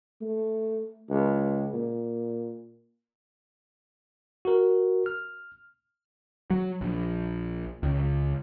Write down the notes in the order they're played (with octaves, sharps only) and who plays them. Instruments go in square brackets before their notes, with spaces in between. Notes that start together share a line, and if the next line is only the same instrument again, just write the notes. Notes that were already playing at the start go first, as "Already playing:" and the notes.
[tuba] A3
C#2
A#2
[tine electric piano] F#4 A#4
F6
[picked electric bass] F#3
A#1
C#2